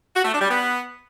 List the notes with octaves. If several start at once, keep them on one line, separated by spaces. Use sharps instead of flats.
F#4
A3
D4
G3
B3